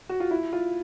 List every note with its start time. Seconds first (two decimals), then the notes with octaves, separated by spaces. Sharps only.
0.09 F#4
0.20 F4
0.31 E4
0.53 F4